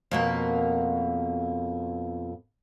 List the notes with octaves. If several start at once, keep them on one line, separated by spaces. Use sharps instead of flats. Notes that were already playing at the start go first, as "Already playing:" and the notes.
F2 B2 A#3